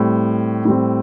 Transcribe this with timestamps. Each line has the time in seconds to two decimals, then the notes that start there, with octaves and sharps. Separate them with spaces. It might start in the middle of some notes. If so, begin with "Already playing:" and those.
Already playing: A2 G3 C4
0.65 A2 G3 C4